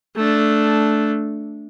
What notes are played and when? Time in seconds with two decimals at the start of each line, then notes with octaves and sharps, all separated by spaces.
0.16 A3 D4